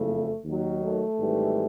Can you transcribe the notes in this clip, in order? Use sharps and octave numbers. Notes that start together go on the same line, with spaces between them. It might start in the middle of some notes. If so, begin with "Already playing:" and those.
Already playing: F#1 F2 C#3 A3
D#2 D#3 F#3
A3
G#1 G#2 E3 G3